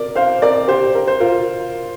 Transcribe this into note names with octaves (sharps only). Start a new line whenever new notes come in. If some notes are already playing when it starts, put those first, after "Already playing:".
Already playing: A#4 D5
C5 F5
A#4 D5
G4 C5
A#4
C5
F4 A#4